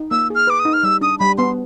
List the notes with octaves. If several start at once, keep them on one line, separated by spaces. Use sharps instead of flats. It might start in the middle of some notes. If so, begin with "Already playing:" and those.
Already playing: D#4
A#3 E6
G#4 F6
B4 D6
D#6
D#4
F6
G3 E6
D4 D#6
G3 B5
B3 C6